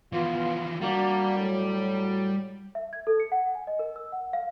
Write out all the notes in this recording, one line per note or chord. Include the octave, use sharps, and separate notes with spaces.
E3 F3 B3 F4
G3 A#3 D4 F#4
A2 F#3
E5
G#6
A4
C#7
F#5
G#5
D#5
A#4
E6
F#5
F5